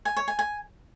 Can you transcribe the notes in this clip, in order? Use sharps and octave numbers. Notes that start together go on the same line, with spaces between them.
G#5
C#5
G#5
G#5